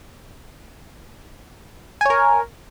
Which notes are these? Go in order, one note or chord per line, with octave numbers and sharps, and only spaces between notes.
A#4 C#5 G#5